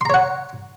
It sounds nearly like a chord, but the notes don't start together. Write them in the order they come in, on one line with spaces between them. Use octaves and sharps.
C6 A#5 C#5 F#5